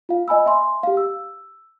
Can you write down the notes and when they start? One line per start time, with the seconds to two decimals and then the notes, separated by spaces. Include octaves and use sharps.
0.09 F4 F5
0.28 D#5 G#5 B5 E6
0.46 E5 G#5 C6
0.83 G4 F5
0.97 E6